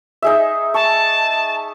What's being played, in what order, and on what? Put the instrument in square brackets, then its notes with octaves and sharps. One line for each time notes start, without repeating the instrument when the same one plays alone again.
[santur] D#4 G#4 E5
[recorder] A5 [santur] C#6